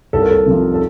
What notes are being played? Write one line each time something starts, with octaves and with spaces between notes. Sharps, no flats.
C2 A4
A#4
A4
C3 F3
A4